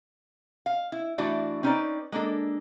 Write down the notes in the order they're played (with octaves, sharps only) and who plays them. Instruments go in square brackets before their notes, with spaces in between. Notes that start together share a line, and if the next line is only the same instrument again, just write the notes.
[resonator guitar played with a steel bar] F5
E4
E3 A3 D4 E4 F#4 D5
C4 C#4 D#4 A#4 B4 D5
G#3 A#3 D4 A4